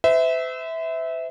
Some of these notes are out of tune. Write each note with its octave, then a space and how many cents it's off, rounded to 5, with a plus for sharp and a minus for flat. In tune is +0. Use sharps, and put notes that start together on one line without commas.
C5 -45 E5 -15